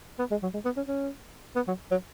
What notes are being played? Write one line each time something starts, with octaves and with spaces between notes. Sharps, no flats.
B3
G#3
F#3
G#3
B3
C#4
C#4
B3
F#3
F#3